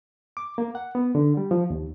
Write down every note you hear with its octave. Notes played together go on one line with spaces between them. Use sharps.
D6
A#3
F#5
B3
D3
G3
F3
D#2